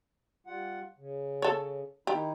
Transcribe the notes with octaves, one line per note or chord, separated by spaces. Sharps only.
G3 F4 F#5
C#3
A4 C#5
D#3 D#4 E4 G4